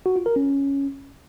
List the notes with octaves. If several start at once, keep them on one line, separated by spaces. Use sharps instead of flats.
F#4
F4
A#4
C#4